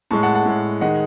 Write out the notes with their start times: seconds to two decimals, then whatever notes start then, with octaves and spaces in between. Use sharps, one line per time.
0.11 A2 G#3 A5 C#6
0.23 F#5 A5
0.35 F#5 A5
0.46 A2 G#3
0.81 D#3 G#3 D#5 F#5